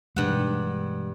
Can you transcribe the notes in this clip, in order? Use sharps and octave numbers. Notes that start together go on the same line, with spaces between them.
G2 B2 E3 G#3 F#5